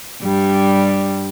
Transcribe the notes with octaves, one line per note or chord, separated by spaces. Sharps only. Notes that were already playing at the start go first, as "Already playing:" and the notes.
G2 G3